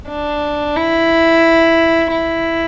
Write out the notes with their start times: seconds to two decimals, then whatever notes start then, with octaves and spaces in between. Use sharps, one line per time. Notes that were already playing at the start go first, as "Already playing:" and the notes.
0.08 D4
0.76 E4
2.12 E4